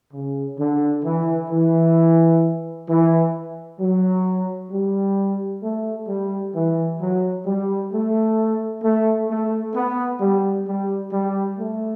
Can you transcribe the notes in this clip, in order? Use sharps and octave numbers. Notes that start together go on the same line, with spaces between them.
C#3
D3
E3
E3
E3
F#3
G3
A3
G3
E3
F#3
G3
A3
A3
A3
B3
G3
G3
G3
A3